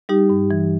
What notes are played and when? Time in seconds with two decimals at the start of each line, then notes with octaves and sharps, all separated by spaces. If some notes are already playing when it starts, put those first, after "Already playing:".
0.09 G3 D#4 G4
0.30 G2
0.51 E3